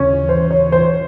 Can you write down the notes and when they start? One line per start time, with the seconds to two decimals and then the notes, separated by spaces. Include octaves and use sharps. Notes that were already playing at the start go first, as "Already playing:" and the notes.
Already playing: D#2 C#3 E3 C#4
0.29 C5
0.51 C#5
0.72 C5